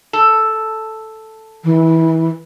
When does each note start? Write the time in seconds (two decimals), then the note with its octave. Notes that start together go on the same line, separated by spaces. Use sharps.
0.13 A4
1.64 E3